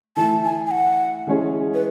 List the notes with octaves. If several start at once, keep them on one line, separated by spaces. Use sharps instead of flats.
E3 A3 E4 A5
G#5
G#5
F#5
E3 G#3 C#4 G#4
B4